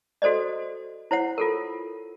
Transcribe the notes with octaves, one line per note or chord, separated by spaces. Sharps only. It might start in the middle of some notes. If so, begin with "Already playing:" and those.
F#4 A4 C5 D5 D#5
E4 C5 C#5 F#5
F4 A4 A#4